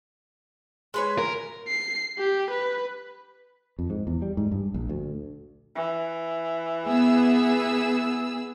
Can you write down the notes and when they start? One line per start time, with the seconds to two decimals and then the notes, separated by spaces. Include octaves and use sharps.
0.94 G#3 B4 C#5
1.18 A#4
1.68 C7
2.19 G4
2.51 B4
3.79 F2
3.90 G#2
4.07 E2
4.22 G3
4.37 G#2
4.52 G2
4.74 A#1
4.89 D2
5.75 E3
6.85 B3 G#4 E6